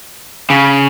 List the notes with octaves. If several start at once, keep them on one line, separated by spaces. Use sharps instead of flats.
C#3